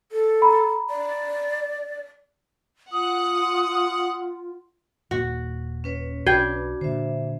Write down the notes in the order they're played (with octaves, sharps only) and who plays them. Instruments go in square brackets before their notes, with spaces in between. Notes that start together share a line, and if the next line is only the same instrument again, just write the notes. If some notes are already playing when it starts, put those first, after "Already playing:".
[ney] A4
[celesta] A#5 B5
[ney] D5
[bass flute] F4 [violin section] F#5 [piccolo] D#6
[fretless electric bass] D#1 A#2 A#3 [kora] F#4
[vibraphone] C#4 B4 C#5
[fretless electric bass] B1 [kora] D4 G5 [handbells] F#4 G#6
[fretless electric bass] A#2 D3 [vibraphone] C5 E5